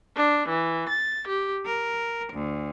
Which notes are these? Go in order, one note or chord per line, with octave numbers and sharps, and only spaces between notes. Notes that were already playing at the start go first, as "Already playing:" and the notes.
D4
E3
A6
G4
A#4
D2